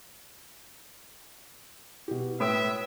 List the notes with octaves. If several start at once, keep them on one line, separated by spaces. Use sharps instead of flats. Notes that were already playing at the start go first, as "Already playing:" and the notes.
B2 G4
A2 B4 E5 G5 D#6 D7